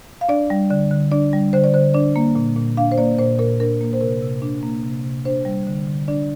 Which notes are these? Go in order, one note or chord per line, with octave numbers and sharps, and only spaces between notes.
F5
D4 D5
G3
D3 D5
D3
D4 D5
G3
D3 C5
D5
D3 C5
D4 D5
A#3
A#2
A#2
D4 F5
C5
A#3 D5
A#2 C5
A#2 A#4
D4 A#4
A#3
C5
C3 A#4
C3
D4
A#3
C3
C3
D4 C5
G3
D3
D3
D4 D5